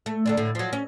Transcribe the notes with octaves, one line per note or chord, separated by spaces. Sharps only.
A3
D3 G#3 D4
A2 D3
F3 F#3
C#4